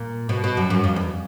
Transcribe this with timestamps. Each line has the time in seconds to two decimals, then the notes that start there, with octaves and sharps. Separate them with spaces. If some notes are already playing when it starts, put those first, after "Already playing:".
Already playing: A#2
0.29 B2
0.44 B2
0.57 F#2
0.70 F#2
0.84 F2
0.96 E2